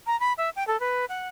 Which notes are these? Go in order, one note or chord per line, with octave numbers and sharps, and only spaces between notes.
A#5
B5
E5
G5
A4
B4
F#5